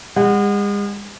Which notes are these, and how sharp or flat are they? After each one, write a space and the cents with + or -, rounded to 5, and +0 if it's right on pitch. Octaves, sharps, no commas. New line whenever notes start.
G#3 -40 F#5 +0